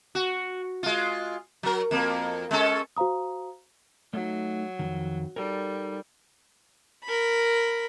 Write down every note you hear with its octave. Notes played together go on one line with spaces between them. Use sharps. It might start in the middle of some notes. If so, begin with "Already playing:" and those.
F#4
G#3 F4
F#3 A#4
F2 A#3
G#3 C#4 A4
F#4 C5 F5 A#5 D#6
F#3 A3 D#4
F2 G#2 D#3
G3 D#4 A4 A#4
A#4 B5